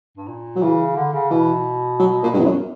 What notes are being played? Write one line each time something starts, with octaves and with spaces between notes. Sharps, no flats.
G2
A#2
F#3
C#3 E3
D3
C#3
B2 E3
F#3
A#2
G2
E2
F#2